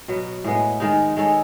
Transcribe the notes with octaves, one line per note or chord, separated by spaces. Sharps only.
B2 F#3 B3
A2 G#3 B3
D#3 G#3 D#4
G#3 D#4 A4 C#5